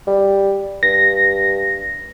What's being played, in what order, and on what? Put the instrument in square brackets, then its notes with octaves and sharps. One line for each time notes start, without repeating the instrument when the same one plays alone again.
[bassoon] G3
[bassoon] G2 [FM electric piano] A#6